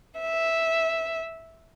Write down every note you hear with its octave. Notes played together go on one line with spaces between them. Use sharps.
E5